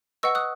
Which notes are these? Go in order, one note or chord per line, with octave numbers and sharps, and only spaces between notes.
B4 D#5 F#5 C#6 E6
D#6 F#6